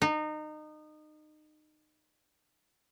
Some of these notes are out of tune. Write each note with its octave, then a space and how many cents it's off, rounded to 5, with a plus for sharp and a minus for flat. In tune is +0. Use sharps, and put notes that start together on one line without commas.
D#4 -25